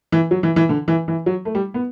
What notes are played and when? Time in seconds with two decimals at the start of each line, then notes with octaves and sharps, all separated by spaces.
0.12 E3
0.31 F#3
0.43 E3
0.56 E3
0.69 D3
0.88 E3
1.08 E3
1.26 F#3
1.45 A3
1.55 G3
1.74 B3